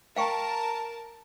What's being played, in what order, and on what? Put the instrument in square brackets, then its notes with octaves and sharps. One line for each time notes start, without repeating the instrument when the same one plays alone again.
[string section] A#4 A5 [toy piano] F5 G5 C#6